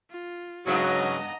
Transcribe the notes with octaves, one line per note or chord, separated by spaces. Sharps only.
F4
G2 C#3 F#3 B3 D4 D#5 A#5